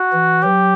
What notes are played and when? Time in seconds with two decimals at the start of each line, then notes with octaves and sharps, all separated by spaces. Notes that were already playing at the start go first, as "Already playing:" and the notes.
Already playing: F#4
0.13 E3
0.43 F#3 G4